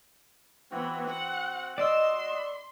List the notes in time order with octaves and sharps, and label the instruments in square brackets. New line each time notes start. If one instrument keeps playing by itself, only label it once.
[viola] E3 B3 [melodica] C4 F#4
[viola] F#5
[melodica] F#4 [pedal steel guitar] D5 E6 [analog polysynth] D#5 E7 [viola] C6